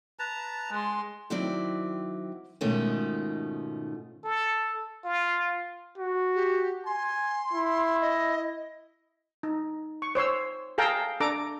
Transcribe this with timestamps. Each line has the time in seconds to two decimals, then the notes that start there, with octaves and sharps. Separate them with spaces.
0.19 B4 A5 A#5
0.71 G#3 C6
1.30 D#3 F#3 C4 E4 D5
2.61 G#2 B2 D#3 A3 C#4 F4
4.24 A4
5.05 F4
5.98 F#4
6.35 G4
6.86 G#5 C6
7.53 E4
8.01 D#5
9.43 D#4
10.02 C#6
10.15 C5 C#5 C6 E6
10.78 G#4 A4 F5 G5 A5 A#5
11.20 D4 A4 A#5 D6